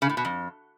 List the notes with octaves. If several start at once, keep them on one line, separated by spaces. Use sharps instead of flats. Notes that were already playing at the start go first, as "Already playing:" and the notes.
C#3
A2
B2
F2